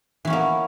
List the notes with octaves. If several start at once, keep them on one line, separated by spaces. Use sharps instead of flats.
E3 A#3 B3 C#4